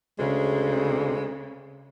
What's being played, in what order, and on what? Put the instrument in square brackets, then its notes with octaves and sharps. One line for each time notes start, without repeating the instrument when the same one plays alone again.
[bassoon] D2 [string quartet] C#3 [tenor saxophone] G#3